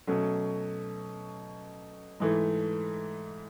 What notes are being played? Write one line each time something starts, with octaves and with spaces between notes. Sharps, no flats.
B2 F#3 A3 C#4
G#2 E3 A3